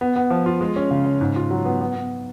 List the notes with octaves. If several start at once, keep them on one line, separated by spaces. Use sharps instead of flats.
B3
B3
F3
F4
G#3
C#4
C#3
C#3
G#2
F4
F#3
B3
B3
B3